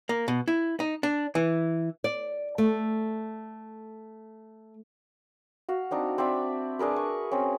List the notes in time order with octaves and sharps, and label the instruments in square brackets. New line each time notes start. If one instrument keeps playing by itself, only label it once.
[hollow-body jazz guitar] A#3
B2
E4
D#4
D4
E3
[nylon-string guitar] D5
A3
[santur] F#4 F5
C4 D4 D#4
C4 D5 E5 B5
D4 G#4 A#4 B4
C#6
C4 C#4